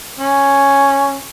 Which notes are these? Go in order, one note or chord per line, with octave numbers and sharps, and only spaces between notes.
C#4